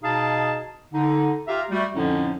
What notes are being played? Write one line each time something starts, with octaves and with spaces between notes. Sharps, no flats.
B2 D#4 G#4 F5 A5
D3 D#4
F4 G4 E5 F5 A#5
G3 A3 F#4
F2 A2 D3 F3 C#4 D#4